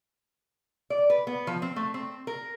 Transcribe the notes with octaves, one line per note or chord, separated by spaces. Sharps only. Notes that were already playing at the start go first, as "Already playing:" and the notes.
D5
B4
B3
F3
C4
A3
C4
A#4